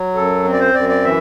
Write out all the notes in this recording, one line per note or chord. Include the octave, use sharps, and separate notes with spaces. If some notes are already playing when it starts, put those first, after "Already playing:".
Already playing: F#3
F#2 A4
C4
D5
C5
F#2 D5
D5
E3 E5